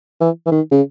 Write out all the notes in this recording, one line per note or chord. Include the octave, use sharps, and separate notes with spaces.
E3
E3
D#3
C#3